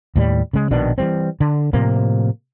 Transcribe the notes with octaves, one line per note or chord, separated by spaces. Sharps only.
D#2 A2 G3
C#3 G#3
A#1 B2 D#3 D4
E3 G3 C4
D3
A2 C3 F3 A#3